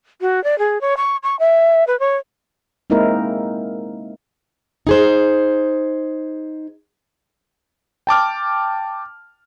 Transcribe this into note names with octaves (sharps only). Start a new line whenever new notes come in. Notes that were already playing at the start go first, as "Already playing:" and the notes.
F#4
D5
G#4
C#5
C#6
C#6
E5
B4
C#5
G#3 A#3 C4 D#4 E4 A#4
D#4 G#4 C5
G5 A5 D6 F6